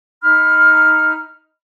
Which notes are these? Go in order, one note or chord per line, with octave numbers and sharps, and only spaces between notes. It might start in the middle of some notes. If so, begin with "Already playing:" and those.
D#4 B5 F6